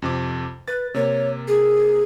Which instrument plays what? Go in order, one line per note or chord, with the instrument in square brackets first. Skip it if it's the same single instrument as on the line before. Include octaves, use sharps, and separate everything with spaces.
[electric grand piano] F2 C3 D6
[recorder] B4 [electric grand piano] A6
[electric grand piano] C3 A#3 [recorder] C#5
[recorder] G#4